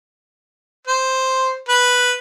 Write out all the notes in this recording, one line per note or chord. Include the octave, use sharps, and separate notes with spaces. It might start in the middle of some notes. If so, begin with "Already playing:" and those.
C5
B4